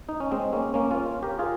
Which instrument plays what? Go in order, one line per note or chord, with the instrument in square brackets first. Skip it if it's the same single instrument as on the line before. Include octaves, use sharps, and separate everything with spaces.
[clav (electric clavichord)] D#4
C#4
G#3 C4
A#3 C#4
A#3 C#4
C#4 F4
G4 A#4
F4 G#4